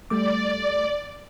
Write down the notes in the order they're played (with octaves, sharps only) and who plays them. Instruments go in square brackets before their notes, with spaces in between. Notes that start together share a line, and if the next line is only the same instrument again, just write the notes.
[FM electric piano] G3 A3 D6 [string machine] D5